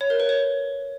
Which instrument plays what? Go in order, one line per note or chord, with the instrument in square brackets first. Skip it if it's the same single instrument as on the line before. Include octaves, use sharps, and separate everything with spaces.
[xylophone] C#5
A#4
B4
C#5